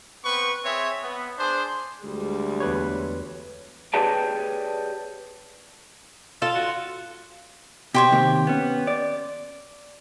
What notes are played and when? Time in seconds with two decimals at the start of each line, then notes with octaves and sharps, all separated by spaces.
0.24 B3 C4 B4 C#6
0.64 C4 G#4 C#5 E5
1.03 B3
1.39 D4 G#4 C5
2.04 D2 G3 G#3
2.60 E2 B4 C#5
3.94 G4 G#4 B4 C#5 D5 A5
6.42 F4 A4
6.55 F#4
7.94 B2 G4 C5 C#5
8.11 C3 D#3 A#3
8.47 B3 C#4
8.87 D5